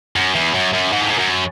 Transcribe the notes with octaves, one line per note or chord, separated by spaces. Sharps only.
F#2
E2
F#2
F#2
G#2
A2
G#2
F#2